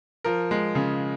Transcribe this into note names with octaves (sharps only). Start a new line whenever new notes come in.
F3 A#4
G#3
C#3